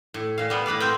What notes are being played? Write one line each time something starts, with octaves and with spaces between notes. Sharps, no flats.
A2
A#2 F5
G3 B3
A2 B4 D5 F5
C4 A#4 G5